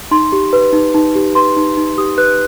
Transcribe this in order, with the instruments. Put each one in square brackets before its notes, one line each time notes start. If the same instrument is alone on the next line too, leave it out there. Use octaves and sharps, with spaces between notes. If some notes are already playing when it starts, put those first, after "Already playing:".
[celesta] D#4 C6
G4
B4
D#4
D#4
G4
B4 C6
D#4
D#4
G4 D#6
B4 F#6